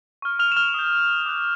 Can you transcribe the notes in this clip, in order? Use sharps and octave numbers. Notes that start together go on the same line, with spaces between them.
C#6 F6
F6 F7
E7
F6 F7
D#6 G6
D6 F#6